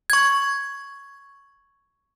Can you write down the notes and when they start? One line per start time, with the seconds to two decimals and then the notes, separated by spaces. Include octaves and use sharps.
0.10 C#6 G#6